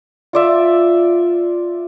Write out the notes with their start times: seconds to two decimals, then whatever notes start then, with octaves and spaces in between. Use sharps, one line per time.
0.33 F4 D5 E5